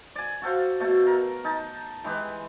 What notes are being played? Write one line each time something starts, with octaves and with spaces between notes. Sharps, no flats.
D5 G#5
F#4 A4 C5 F5
B2 A3 A4
A#4
D#4 A5
E3 G#3 G4 B4